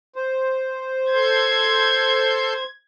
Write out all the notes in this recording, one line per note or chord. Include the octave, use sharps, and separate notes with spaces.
C5
A4 C6 G6 G#6